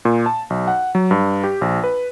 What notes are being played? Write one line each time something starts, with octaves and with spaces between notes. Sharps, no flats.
A#2
A5
B1
F#5
F#3
G2
G4
A#1
B4